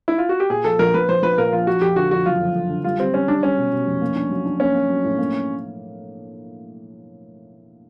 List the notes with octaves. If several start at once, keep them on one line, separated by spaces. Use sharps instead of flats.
E4
F4
F#4
G4
A#2 G#4
F3 A4
A#1 A#4
A#1 B4
A#1 C5
A#1 B4
A#2 A#4
F3 F4
F3 F#4
F2 G4
D3 F#4
F2 F#4
F#1 F4
F2
F2
D3
G3 F4
G3 C4
G3 C#4
G3 D4
G3 C#4
B2
B2
F1
A#3
D4
F#3
D4
A#3 C#4
A#3
F#3
A2
A#3